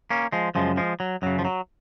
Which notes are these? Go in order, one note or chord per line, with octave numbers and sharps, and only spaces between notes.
A#3 C#4
F3 G#3
F#2 C#3 F3 G#3
F3 G#3
F#3
F#2 C#3 F#3
F3
F#3